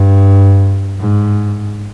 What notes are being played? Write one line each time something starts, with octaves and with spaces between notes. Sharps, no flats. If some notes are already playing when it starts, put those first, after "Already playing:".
Already playing: G2
G#2